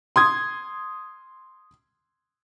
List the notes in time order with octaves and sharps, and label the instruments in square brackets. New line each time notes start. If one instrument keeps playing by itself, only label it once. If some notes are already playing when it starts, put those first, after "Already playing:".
[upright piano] C6 D#6 G#6